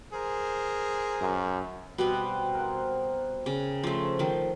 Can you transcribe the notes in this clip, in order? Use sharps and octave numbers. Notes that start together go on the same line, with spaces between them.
G#4 A#4 C5
F#2
B2 G3 B3 C4 B4
A#4 C5 F#5
C#3
F3 A3 C5
D#3 F3